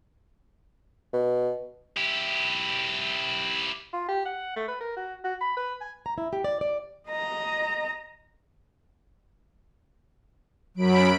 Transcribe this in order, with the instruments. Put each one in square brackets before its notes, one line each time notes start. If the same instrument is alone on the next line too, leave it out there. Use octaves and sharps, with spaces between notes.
[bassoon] B2
[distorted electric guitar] E4 G4
[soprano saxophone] F4
G4
F#5
A3
B4
A#4
F#4
F#4
B5
B4
G#5
[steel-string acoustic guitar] A#5
E4
G4
D5
D5
[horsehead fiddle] D#5 A#5
[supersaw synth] F#2 B5 D7 [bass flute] F#3